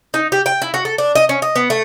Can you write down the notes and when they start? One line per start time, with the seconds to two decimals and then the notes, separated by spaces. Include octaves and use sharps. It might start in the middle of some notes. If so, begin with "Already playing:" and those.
0.14 D#4
0.32 G4
0.46 G5
0.62 E4
0.74 F#4
0.85 A4
0.98 D4
1.15 D#5
1.29 C#4
1.42 D#5
1.56 B3
1.70 A3